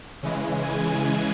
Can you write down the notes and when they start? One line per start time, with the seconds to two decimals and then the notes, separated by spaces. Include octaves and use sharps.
0.23 C#3 E3 G#3
0.63 G#5